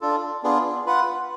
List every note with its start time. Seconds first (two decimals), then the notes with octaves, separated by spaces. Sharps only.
0.01 D4 F4 A4
0.44 B3 D4 F4 G#4
0.86 F4 B4 F#5